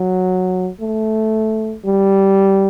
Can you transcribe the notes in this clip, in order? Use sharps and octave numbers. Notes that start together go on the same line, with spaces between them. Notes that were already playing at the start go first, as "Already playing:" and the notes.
Already playing: F#3
A3
G3